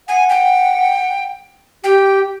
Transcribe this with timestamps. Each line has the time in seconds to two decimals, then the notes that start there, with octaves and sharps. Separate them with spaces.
0.08 F#5 G#5
0.29 G5
1.84 G4 G5